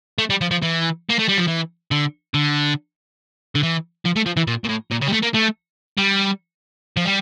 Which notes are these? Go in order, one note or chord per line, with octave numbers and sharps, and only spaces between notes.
A3
G3
F3
F3
E3
A#3
A3
G3
F3
E3
D3
D3
D3
E3
F3
A3
F3
E3
A#2
A#2
A2
A#2
C#3
G3
A3
A#3
A3
G3
F3
G3